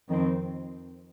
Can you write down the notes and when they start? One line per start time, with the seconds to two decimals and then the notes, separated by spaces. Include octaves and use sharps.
0.09 F2 D#3 C4